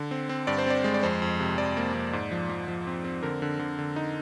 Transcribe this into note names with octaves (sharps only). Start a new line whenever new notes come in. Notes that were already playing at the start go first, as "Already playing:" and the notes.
Already playing: D3
C4
C4
G2 D5
C5
C4 D5
G#3
D5
F2 C5
F2
C3
F2 D5
A#3
F2
G#2
F3
F3
F3
C4
C4
D3 A#4
D3
D3
D3
D#4